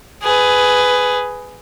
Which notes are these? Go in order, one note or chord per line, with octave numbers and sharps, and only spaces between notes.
G#4 B4